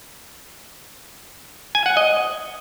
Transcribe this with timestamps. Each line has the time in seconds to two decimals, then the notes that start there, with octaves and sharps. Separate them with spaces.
1.75 G#5
1.86 F#5
1.97 D#5